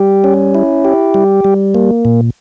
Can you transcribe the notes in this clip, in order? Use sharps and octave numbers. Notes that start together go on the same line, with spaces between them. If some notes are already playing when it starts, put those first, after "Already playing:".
Already playing: G3 G4
C#4
E4
G4
G3
G3
A#3
A#2